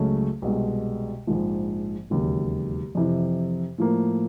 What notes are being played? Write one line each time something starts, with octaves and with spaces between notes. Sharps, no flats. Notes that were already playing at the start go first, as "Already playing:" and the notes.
Already playing: C#2 C#3 F#3 A3 C#4
C2 B2 G#3
A#1 G#2 F3
E1 D#2 C#3 F#3
F2 C3 E3
A2 F3 A#3